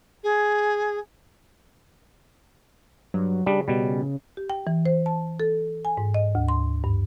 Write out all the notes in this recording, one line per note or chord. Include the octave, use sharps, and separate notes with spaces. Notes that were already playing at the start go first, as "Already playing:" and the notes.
G#4
G2 F#3
C#3 G3 D4
B2 G3
G4
G5
E3
C5
A5
A4
G#5
G#2
D#5
D2
C6
G2